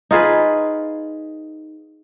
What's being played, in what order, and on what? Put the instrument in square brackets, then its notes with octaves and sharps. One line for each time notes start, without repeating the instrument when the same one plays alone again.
[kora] D#4 F4 G#4 B4